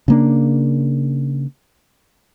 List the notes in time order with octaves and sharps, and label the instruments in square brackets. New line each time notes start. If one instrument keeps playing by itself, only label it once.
[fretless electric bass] C#3 A#3 D4